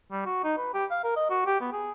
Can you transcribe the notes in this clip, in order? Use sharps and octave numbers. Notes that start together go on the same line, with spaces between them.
G3
F#4
D#4
B4
G4
F5
A#4
D#5
F#4
G4
B3
G#4